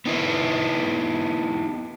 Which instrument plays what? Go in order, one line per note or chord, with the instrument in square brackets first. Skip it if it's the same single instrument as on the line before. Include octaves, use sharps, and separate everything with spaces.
[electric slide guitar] B3 D#4 E4 B4